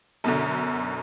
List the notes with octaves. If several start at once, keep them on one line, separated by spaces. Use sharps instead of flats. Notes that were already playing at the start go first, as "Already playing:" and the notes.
F#2 B2 D3